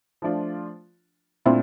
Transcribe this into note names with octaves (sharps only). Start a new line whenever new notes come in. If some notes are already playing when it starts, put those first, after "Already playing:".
F3 A3 D4 F4
A#2 A3 C4 D4 E4 F4